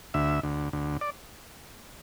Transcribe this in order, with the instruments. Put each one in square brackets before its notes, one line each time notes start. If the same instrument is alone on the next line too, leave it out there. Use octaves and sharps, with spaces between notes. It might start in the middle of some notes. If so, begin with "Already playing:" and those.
[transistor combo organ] D2 E5
D2
D2
D5